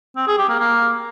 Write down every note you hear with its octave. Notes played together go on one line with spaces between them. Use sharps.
C4
G#4
G4
A#3
A#3